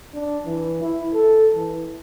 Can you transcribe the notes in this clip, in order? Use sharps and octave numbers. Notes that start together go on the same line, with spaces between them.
D4
E3
E4
A4
E3